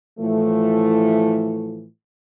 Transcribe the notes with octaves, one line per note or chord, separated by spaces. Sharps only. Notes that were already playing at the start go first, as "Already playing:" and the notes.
A2 E3 F3 A3